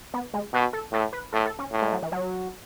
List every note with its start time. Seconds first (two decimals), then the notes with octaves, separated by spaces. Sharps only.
0.14 B3
0.34 G#3
0.53 B2 F#4
0.73 A4
0.92 A2 A4
1.13 B4
1.32 A2 A4
1.45 A4
1.59 C#4
1.72 A2
1.82 G#3
1.92 F#3
2.02 E3
2.12 F#3